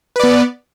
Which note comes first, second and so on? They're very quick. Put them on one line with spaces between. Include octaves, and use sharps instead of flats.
B4 D5 B3